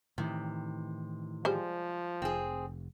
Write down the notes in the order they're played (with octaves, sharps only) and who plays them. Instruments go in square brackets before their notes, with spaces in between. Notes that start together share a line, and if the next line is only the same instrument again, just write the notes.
[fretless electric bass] A2 D#3 E3 [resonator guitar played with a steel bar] C3
[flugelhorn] F3 [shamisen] G3 G#3 C5
[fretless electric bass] F1 [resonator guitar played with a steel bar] C4 G#4